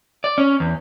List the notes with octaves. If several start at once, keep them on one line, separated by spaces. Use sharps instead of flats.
D5
C#4
E2